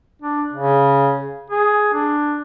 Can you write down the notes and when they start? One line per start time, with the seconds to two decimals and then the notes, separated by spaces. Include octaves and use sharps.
0.22 D4
0.53 C#3
1.50 G#4
1.93 D4